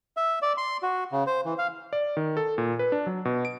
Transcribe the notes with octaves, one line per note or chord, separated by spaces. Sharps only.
E5
D5
C6
F#4
C#3
C5
E3
F5
D5
D#3
A4
A#2
B4
D4
F#3
B2
D7